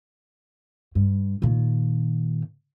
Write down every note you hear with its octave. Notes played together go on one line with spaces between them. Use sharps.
G2
A#2 D#3